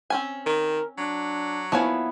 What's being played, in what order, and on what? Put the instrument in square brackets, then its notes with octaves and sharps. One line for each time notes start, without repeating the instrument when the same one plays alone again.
[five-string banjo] C4 C#4 G#5
[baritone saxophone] D#3 [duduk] A#4
[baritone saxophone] F#3 [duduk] D4
[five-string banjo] F3 C#5 G#5 [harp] B3 E4